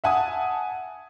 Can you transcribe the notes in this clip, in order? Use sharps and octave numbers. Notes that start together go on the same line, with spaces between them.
E5 F#5 G#5 A5 D#6